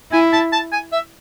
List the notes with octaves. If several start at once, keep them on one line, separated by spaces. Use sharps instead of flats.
E4 G#5
A5
A5
G#5
E5